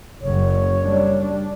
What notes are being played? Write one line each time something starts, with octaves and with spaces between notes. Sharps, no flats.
F#1 F#2 C#5
G3 D4